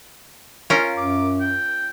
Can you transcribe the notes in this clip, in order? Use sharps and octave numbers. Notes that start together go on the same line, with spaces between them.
C#4 F4 A#4
F#2 D6
G5